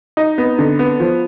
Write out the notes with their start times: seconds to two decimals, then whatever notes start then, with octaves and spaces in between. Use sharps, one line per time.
0.17 D#4
0.38 B3
0.59 D3
0.79 B3
1.00 F3